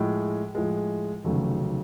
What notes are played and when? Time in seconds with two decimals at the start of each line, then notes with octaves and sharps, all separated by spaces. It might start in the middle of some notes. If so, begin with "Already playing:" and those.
Already playing: A2 F3 G#3
0.55 A2 F3 G#3
1.24 F1 D#2 C#3 F#3 A3